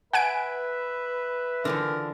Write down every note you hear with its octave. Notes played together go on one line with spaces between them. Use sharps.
B4 E5 F#5 G#5 D7
D3 E3 F3 A#4